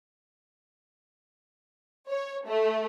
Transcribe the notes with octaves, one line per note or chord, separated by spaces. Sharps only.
C#5
A3